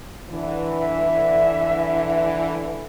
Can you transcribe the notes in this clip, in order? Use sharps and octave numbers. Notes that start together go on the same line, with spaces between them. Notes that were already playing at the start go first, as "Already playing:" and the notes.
D3 E3
E5